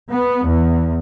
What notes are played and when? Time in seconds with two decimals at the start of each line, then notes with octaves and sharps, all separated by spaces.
0.11 B3
0.46 E2